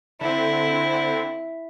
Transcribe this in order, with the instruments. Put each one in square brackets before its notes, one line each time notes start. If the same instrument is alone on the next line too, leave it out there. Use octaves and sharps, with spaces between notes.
[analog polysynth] D3 C4 [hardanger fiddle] E4